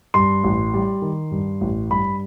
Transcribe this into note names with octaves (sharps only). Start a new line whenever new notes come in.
G2 C6
A1
G3
D#3
G2
A1
G2 B5